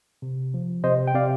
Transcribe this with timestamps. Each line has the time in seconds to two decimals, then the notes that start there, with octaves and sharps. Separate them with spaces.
0.22 C3
0.54 F3
0.84 C3 C5 D#5
1.07 G5
1.14 C3 D5 F5